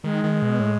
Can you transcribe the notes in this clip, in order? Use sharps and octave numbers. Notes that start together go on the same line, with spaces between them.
D#3 G#3
D#3
B2
A2